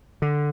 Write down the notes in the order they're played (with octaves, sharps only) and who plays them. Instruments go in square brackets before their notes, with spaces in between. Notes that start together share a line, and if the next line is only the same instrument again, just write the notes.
[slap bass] D3